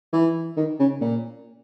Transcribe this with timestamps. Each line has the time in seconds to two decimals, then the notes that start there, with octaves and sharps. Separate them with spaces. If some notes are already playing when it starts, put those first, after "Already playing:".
0.13 E3
0.57 D#3
0.79 C#3
1.01 A#2